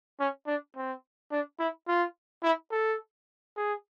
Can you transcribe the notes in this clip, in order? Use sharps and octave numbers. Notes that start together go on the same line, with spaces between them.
C#4
D4
C4
D4
E4
F4
E4
A4
G#4